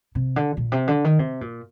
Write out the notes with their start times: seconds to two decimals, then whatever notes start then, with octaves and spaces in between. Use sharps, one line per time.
0.15 C3
0.36 D3
0.57 A#2
0.72 C3
0.88 D3
1.04 D#3
1.19 C3
1.41 A#2